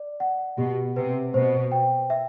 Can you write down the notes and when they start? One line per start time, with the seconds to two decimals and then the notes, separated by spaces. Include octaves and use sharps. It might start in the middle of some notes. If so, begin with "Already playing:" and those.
Already playing: D5
0.20 F#5
0.58 B2 G4
0.96 C3 B4
1.34 B2 C5
1.72 G5
2.10 E5